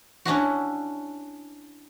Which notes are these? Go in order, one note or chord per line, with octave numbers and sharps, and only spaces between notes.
C#4 D4 E4 F#4